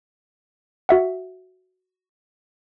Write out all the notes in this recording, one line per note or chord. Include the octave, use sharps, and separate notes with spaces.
F#4 E5 F#5